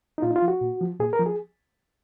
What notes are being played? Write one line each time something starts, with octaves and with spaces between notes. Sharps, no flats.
D#4
A#2 F4
D#4
F4
F3
F#4
A#2
F3
A#2 G#4
A#4
F3
G#4